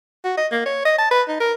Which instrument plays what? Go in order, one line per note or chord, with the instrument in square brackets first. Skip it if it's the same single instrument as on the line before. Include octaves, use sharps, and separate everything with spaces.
[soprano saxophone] F#4
D#5
A#3
C#5
D#5
A5
B4
D#4
A#4